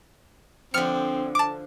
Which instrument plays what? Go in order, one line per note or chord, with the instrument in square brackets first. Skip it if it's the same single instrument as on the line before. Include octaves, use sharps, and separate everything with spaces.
[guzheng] D3 F3 [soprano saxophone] C4 [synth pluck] F6 C#7
[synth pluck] A5 D6